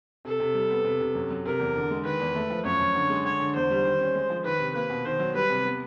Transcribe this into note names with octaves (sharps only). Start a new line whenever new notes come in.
C3 A4
C3
G3
B3
C3
C3
F#2
F#3
C3 A#4
E2
D3
G#3
D#3 B4
E2
A3
F3
F#2 C#5
F#2
D3
G#3
D3 C#5
D3
E2 C5
G3
D#3
C#4
G#3
F3
D#3 B4
C3
A#3 B4
B2
D#3 C5
F#3
G3 B4
C3
B3